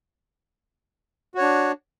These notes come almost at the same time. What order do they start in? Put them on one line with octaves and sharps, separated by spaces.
F#4 C#5 D4